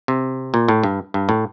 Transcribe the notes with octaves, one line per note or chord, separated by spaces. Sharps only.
C3
A#2
A2
G2
G2
A2